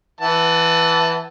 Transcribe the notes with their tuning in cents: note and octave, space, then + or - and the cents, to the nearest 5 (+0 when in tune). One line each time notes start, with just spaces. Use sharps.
E3 +0 F#5 +20 A5 +0